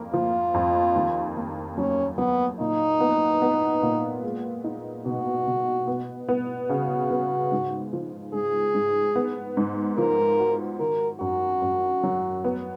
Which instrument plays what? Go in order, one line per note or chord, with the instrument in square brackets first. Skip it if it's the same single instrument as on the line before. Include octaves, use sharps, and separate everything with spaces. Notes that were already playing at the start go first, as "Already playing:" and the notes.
Already playing: [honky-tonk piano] F2 A#3
[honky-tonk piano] F3 [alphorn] F4
[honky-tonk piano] F2
D#2
A#3
[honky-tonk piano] F#3 [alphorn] C#4
[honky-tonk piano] F#3 [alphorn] B3
[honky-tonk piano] A#2 [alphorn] D#4
[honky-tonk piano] B3
B3
A#2
G#3
D#4
[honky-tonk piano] B2 [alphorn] F#4
[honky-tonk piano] B2
B3
B3
[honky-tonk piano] C#3 [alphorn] F#4
[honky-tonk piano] B3
G#2
F3
[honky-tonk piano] G#2 [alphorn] G#4
[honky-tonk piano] G#2
B3
G#2
[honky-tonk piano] F3 [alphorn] A#4
[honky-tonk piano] F#4
[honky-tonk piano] D#3 [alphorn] A#4
[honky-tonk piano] F#2 [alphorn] F#4
[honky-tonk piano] F#2
F#3
B3